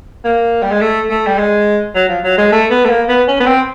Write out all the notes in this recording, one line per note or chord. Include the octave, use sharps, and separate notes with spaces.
A#3
G3
G#3
A3
A3
G3
G#3
F#3
F3
F#3
G#3
A3
B3
A3
A#3
B3
C#4
B3
C4